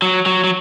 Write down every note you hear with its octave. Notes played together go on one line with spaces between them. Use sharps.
F#3
F#3
F#3